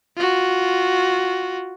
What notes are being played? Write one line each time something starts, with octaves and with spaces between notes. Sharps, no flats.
F4 F#4